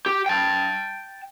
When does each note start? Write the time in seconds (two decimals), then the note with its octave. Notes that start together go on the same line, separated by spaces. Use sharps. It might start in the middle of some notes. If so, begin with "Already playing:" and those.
0.06 G4
0.26 G5 A5